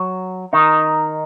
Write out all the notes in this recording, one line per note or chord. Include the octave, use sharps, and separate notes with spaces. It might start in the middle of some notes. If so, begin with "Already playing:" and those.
Already playing: F#3
D#3 D#4